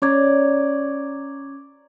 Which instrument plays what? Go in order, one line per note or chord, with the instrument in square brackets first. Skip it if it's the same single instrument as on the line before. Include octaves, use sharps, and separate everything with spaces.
[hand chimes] C#4 D6 G#6 [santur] C#5 D5 A#5